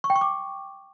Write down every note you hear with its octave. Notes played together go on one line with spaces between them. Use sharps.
C#6
G5
C#6
D6